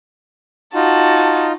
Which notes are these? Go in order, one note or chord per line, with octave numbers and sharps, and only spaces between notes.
D#4 F4 F#4 A5